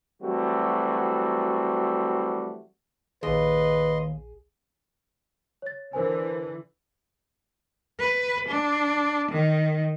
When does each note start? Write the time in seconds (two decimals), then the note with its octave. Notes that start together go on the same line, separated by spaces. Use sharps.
0.22 E3 F#3 G3 A3 C4 F#4
3.23 A#1 D#2 G#4 B4 D#5 C6
5.62 C#5 A6
5.93 D3 E3 A#4 C5 G#5
8.00 B4
8.48 D4
9.31 D#3